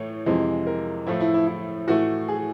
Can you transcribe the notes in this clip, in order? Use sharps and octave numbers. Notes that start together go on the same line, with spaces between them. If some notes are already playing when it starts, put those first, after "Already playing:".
Already playing: A2 E3 A3 C#5
F2 C3 E3 G#3
A#4
A2 F3 A3 E4
E4
E4
E4
A2 E3 A3 F#4
G#4